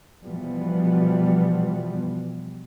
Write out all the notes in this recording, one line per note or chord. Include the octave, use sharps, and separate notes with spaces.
B2 E3 F3 G3 B3